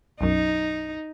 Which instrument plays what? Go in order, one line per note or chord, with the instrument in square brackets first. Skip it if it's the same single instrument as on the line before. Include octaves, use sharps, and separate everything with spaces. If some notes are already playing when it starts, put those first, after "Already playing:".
[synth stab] B1 F#2 [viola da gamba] D#4